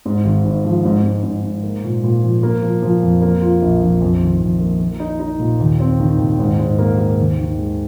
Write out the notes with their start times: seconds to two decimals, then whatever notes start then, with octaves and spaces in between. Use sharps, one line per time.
0.05 G#2
0.25 G#1
0.44 G#1
0.64 F3
0.85 G#2
1.04 G#2
1.23 G#2
1.43 G#2
1.63 A#3
1.84 A#2
2.04 A#2
2.23 F3
2.43 A#3
2.62 F3
2.82 F3
3.03 F2
3.22 A#3
3.42 F4
3.62 A#1
3.82 A#1
4.02 F2
4.20 D#3
4.41 F2
4.60 A#3
4.80 A#3
5.00 D#4
5.19 D#4
5.40 A#2
5.60 D#2
5.80 C4
6.00 D#3
6.18 D#2
6.39 G#2
6.59 G#2
6.79 A#3
6.98 A#3
7.18 D#2
7.37 D#3
7.58 G#3